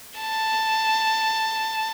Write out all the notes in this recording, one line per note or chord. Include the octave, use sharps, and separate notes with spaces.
A5